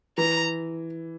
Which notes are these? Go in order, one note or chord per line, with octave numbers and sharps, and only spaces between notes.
E3 A#5